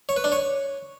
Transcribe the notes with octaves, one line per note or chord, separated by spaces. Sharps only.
C#5
B4
D4
C#5